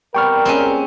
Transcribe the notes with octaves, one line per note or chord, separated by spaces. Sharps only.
G3 B3 C4 A#4 G5 C#6 F6
A#2 G#3 C4 C#4